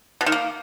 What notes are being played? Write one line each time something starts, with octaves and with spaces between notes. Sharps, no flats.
B2
D#3
A#3